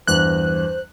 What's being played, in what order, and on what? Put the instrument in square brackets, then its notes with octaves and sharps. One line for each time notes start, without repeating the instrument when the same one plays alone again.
[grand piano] E2 G2 [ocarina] C5 [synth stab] F#6